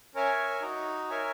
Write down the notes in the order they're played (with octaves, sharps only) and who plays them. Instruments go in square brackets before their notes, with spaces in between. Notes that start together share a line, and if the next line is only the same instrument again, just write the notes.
[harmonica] C#4 [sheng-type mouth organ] A#4 C#5 E5 G#5
[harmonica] D#4 [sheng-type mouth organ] F#4
[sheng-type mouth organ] A#4 C#5 E5 G#5